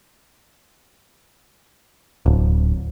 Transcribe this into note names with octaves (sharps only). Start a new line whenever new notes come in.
D1